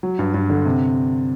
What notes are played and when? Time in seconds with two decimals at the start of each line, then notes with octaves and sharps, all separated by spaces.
0.03 F#3
0.19 G2
0.34 G2
0.50 D3
0.66 C3